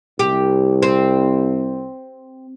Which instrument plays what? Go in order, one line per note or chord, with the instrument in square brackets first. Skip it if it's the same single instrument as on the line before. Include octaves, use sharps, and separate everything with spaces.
[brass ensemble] C2 [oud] G4
[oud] C4